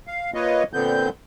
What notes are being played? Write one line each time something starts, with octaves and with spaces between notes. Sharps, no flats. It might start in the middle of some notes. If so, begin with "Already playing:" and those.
F5
A#3 F4 B4 C#5 D#5
A#2 D3 B3 C4 G6